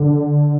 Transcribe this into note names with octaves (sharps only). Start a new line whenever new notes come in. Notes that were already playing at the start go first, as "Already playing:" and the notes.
Already playing: D3